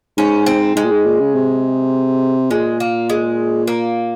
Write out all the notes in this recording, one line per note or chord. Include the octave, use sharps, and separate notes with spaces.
G#2 C#4
C4
G#2 G#3
A#2
G#2
A#2
C#3
C3
A#2 G#3
A#3
G#3
A#3